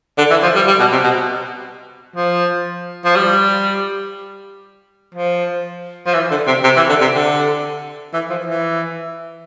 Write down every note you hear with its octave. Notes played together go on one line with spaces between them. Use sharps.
D3
E3
F3
G3
G3
B2
C3
B2
F3
F3
G3
F3
F3
E3
D3
C3
C3
E3
D3
C3
D3
E3
F3
E3